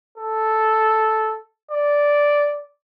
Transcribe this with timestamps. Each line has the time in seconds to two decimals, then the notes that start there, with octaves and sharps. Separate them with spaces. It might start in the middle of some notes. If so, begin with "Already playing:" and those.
0.17 A4
1.71 D5